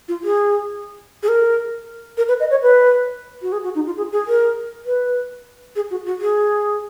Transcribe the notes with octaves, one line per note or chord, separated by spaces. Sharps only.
F4
G#4
G#4
A#4
A#4
B4
D#5
C#5
B4
F#4
G#4
F#4
D#4
F4
G#4
G#4
A#4
B4
G#4
F#4
F#4
G#4